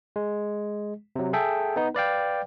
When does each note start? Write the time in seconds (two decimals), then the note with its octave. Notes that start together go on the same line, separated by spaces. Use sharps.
0.16 G#3
1.16 C3 F#3
1.33 G#4 A4 E5 G5
1.76 B3 D#4
1.95 B4 D5 F5 G5